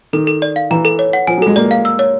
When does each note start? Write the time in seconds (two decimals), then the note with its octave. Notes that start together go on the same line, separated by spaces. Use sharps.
0.13 D#3 A4
0.27 A4
0.42 D5
0.56 F5
0.71 E3 A#5
0.85 A4
0.99 C#5
1.13 F#5
1.27 F3 G#5
1.38 F#3
1.42 G#3 A4
1.56 A#3 D5
1.71 F5
1.85 E6
1.99 C#5